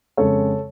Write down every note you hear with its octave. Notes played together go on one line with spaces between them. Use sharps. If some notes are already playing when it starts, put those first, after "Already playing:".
F2 C#3 G#3 A4 C#5